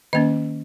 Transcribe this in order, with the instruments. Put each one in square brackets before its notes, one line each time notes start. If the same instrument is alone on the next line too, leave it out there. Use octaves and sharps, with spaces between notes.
[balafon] D#3 A#3 C#4 D#5